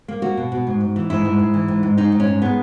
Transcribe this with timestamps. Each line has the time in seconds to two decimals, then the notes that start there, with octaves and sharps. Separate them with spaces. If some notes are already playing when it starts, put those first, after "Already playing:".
0.08 A#3
0.22 A#3 F#4
0.37 B2
0.52 B2
0.67 G#2
0.81 G#2
0.96 E3
1.10 G#2 E4
1.25 G#2
1.39 G#2
1.54 E3
1.68 G#2
1.83 G#2
1.98 G#2 D#4
2.12 G#2
2.20 C#4
2.27 G#2
2.42 G#3 B3